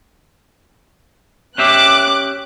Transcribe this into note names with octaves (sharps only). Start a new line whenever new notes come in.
C#4 G4 E5 D6 F#6